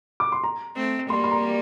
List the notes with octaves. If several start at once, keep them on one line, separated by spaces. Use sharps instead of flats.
D6
C6
A#5
A3 C4
G3 A#3 C6
C6
A#5